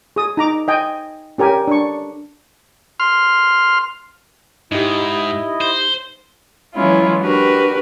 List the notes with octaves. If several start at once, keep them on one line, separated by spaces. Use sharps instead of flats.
G#4 D#6
D#4 A#5 D6
D#5 G5 G#5
C#4 G4 A#4 G#5
D4 C#6
C6 F6
G#2 D#4 E4 G4 D#5
C5
E3 F#3 G#3 C#4 E4 F4
D4 F#4 G4 A#4 B4